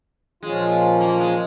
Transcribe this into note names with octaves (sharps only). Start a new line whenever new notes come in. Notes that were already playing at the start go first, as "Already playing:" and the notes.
A#2 F3 G#3 C#4 F4
A#3
G#3